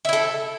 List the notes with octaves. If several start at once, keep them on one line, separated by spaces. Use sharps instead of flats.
E4 A4 E5